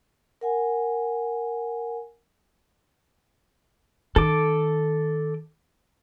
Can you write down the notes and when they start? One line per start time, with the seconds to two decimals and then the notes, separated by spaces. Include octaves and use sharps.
0.41 A#4 F#5 G#5
4.16 D#3 A4 D6